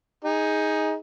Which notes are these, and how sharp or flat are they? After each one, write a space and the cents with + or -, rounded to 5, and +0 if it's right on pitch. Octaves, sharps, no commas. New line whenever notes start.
D#4 +15 G#4 -5